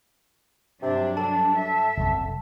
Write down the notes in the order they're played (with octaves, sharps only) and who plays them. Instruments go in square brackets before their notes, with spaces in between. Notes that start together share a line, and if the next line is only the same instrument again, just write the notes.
[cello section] G2 F#3 D4 [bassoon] C3
[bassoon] A4 [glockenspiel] A5
[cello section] E5
[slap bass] F#1 C2